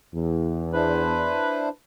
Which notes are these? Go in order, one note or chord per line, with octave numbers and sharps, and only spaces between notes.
E2
D4 E4 B4 C5